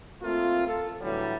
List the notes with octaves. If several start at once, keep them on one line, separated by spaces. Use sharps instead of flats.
A3 A#3 C4 F4
F4 A4
A2 D3 E3 F#3 G3